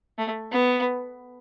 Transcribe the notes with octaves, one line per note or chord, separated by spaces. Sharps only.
A3
B3